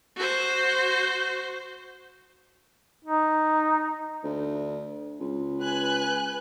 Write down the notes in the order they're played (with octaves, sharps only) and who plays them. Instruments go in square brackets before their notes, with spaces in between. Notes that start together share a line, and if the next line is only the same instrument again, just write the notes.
[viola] F#4 C5
[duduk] D#4
[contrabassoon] D2
C#2
[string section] B4 G#5 F#6